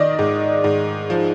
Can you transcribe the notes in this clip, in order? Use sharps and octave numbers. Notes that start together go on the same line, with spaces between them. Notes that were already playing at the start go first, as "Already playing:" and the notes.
Already playing: D#3 D5 D#5
G#2
G#2
F3